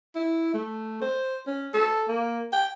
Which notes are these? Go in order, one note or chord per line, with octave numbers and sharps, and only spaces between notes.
E4
A3
C5
C#4
A4
A#3
G5